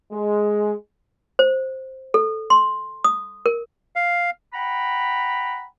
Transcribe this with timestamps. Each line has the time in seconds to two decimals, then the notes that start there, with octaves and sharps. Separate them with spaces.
0.12 G#3
1.39 C5
2.14 A4
2.50 C6
3.04 D#6
3.46 A#4
3.96 F5
4.54 F#5 G5 A#5 B5